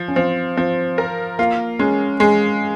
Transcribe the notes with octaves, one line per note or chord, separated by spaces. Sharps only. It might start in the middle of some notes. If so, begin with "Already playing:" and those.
Already playing: F3
C#4
F3 C4
F3 C4
A#4
A#3 F4
G#3 C#4
G#3